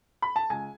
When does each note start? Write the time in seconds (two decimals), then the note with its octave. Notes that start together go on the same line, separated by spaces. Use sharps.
0.22 B5
0.36 A5
0.50 C#2 G#5